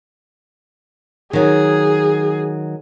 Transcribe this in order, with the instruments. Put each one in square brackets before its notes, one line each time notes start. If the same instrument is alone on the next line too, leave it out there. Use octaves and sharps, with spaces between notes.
[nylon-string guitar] D#3 F#3 [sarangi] G#4